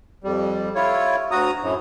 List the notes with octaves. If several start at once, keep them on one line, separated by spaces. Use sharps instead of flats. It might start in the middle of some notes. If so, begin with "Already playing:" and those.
F2 G3
E4 F4 C#5
D2 F#4 A#5 D#6
F#2 A2